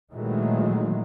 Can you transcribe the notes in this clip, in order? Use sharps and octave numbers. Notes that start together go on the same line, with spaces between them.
A#2 D#3 E3 F#3 G#3 A3